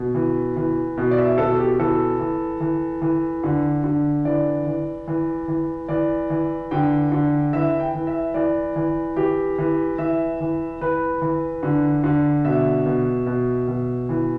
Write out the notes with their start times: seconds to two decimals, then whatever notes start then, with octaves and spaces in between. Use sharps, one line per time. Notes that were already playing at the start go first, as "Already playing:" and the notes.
Already playing: B2
0.15 E3
0.56 E3
0.97 B2
1.11 D5
1.18 E5
1.38 B2 A4
1.59 G4
1.80 E3 A4
2.20 E3
2.61 E3
3.02 E3
3.44 D3
3.84 D3
4.25 E3 D5
4.67 E3
5.08 E3
5.48 E3
5.88 E3 D5
6.30 E3
6.71 D3 G5
7.12 D3
7.53 E3 E5
7.80 G5
7.94 E3
8.07 E5
8.34 E3 D5
8.76 E3
9.16 E3 G4
9.58 E3
9.98 E3 E5
10.40 E3
10.81 E3 B4
11.22 E3
11.63 D3
12.04 D3
12.45 B2 E5
12.86 B2
13.26 B2
13.68 B2
14.09 E3